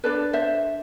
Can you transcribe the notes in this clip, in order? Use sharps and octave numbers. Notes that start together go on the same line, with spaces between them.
D4 A4 B4 D5
C5 E5